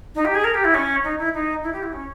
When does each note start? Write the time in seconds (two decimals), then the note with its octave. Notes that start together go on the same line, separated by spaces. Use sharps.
0.15 D#4
0.25 G4
0.35 G#4
0.44 A#4
0.54 G4
0.64 E4
0.74 C#4
1.04 D#4
1.19 E4
1.34 D#4
1.63 E4
1.73 G4
1.83 E4
1.93 C#4